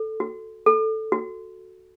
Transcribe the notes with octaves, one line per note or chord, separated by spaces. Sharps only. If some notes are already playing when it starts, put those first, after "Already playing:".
Already playing: A4
F#4
A4
F#4